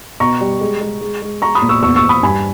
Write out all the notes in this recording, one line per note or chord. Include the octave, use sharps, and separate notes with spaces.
B2 A#5 C#6
G3
G#3
G#3
G#3
G#3
G#3 A#5 C#6
B5 D#6
A#2
C#6 E6
E2 C#6 E6
C#6 E6
E2
B5 D#6
G2 G#5 B5